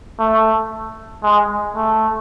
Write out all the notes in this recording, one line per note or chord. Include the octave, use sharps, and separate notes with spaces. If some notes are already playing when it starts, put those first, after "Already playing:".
A3
G#3
A3